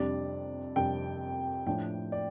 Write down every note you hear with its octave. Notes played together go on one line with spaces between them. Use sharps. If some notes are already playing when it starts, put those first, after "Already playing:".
Already playing: F2 C3 G3 D4 D5
F2 C3 G3 D4 G5
A2 F3 D4 G5
D5